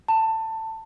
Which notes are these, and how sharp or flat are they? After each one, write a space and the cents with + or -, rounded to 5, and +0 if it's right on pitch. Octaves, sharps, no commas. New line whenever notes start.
A5 +20